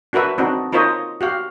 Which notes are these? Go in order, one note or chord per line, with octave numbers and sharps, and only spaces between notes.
D4 F#4 A#4 B4 E5
C4 D4 D#4 F#4
D#4 F4 A#4 C5 C#5 D#5
F#4 G4 F5